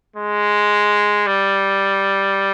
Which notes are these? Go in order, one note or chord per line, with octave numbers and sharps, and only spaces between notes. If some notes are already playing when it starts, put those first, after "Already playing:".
G#3
G3